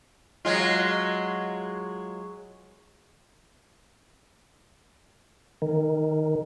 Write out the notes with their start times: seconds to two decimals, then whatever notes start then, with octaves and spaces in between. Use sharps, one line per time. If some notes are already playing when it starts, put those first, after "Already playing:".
0.45 F#3 G#3 F4
5.62 D#3